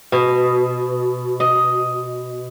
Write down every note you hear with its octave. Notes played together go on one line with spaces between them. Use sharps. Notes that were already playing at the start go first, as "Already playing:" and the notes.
B2
D#5